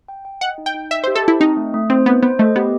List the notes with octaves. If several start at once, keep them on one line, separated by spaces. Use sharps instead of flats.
G5
G5
D#5 F#5
D#4
G5
D#4
D#5 E5
C5
G4
A4
E4 A5
C4 D#4
A3
A3
C4 C5
B3 C5
B3 C5
A3 D#5
B3 G4